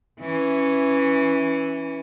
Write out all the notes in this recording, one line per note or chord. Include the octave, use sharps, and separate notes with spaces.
E3 C#4